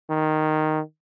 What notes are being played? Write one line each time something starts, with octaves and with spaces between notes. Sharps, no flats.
D#3